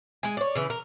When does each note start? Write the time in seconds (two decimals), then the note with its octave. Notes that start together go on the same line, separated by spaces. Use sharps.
0.23 G#3 G#5
0.37 C#5 D5
0.55 C#3 E3
0.70 A#4